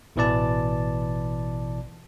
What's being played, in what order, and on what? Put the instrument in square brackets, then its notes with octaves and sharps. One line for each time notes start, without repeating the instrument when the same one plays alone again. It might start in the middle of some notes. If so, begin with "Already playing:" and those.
[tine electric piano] A1 B2 E3 B4 D5 A5